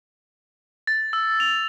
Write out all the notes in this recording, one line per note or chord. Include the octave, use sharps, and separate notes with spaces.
A6
E6
F7